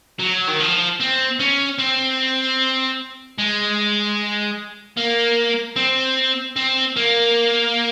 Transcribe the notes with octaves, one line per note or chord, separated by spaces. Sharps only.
F#3
D#3
F3
C4
C#4
C4
G#3
A#3
C4
C4
A#3